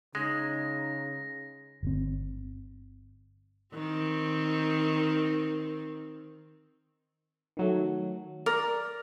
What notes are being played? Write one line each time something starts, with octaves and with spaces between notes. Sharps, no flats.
C#3 G#3 D#4 A#6
G1 C4
D#3 C4
D#3 F#3 A3
A#4 D5